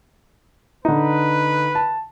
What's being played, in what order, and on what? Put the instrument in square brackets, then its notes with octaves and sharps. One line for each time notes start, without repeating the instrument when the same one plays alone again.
[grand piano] D3 D#4 [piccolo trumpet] B4
[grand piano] A5